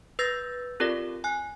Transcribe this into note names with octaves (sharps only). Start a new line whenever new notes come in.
B4 E6 G6 A6 A#6
C4 F4 G4 A4 A#4 D5
G#5 F#6